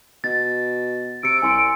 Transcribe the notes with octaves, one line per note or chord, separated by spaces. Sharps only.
B2 A6
C3 E6 C#7 D7
C2 G#5 C6 C#7